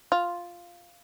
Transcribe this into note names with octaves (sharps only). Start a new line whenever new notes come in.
F4